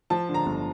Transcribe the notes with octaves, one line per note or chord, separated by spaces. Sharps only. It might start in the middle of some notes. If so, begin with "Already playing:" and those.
F3 A5
D3
A#5
G1